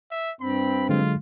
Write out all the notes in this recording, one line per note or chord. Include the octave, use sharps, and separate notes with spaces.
E5
G2 C4 B5
D3 F#3 G#3 F4